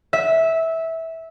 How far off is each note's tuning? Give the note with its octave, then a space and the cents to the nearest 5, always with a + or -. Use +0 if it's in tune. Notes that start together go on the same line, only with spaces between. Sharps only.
E5 -15